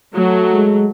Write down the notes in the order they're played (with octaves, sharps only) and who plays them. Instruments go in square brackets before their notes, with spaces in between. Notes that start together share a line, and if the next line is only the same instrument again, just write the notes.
[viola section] F#3 A3
[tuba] G#3